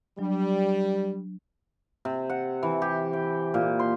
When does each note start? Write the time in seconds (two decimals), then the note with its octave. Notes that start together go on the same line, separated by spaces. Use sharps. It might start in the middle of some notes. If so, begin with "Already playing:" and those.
0.19 F#3 G3 D4
2.05 C3
2.30 F#5
2.63 E3
2.82 G4
3.13 G5
3.54 A#2
3.79 C6